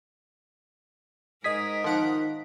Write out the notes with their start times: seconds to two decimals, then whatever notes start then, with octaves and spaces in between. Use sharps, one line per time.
1.44 G#2 G#4 A#4 D#5 D#6 B6
1.84 D#3 F3 F#5 D7